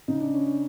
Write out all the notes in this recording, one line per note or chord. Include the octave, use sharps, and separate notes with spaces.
C#3 D#4
D4
C#4
D4